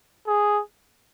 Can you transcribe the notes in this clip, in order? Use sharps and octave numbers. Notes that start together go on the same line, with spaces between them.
G#4